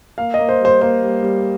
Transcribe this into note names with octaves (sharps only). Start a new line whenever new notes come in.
A#3 F5
D#5
A#3
C5
G3 C5
A#3 C5
G3
G3